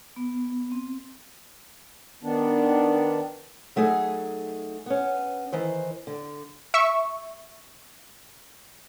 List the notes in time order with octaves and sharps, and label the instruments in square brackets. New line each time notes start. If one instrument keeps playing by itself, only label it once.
[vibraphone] B3
C4
[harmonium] D#3 B3 D4
[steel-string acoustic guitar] F#3 A3 D#4 G#4
B3 C#4
D#3 E3 C5
D3
[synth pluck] E5 C#6